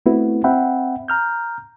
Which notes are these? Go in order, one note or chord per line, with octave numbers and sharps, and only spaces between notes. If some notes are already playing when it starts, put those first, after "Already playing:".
A3 B3 C4 E4 F#4 B4
C4 E5 F#5 G5 B5
A#5 F6 G6